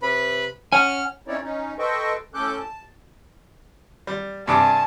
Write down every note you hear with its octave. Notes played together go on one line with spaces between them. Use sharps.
C3 B4 B5
C#4 F#5 G#5 F6
C4 C#4 D#4 E4 C#5 D5
C#4 D#4
A4 B4 C5 D#5 G5 C#6
A2 C#4 A4 D6 F#6 G6
A5
G3
G2 C3 G#5 A5 D6